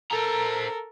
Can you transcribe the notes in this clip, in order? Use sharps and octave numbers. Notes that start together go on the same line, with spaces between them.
A4 A#4 C5 A#5